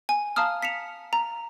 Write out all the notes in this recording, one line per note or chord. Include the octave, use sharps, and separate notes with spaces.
G#5
F5 A5 A#5 D#6 F6
B6 C#7 E7 F7
A#5